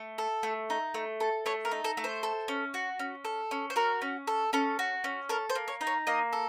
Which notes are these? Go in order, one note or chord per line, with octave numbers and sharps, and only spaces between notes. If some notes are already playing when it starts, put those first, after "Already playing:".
Already playing: A3
A4
A3
D#4
A3
A4
A3 C#5
A#4
D#4
A4
A3
C5
A4
C#4
F#4
C#4
A4
C#4
C5
F#4 A#4
C#4
A4
C#4 A4
F#4
C#4
A4 A#4
C5
A#3
C#5
D#4
C#5
A#3 D#5
A4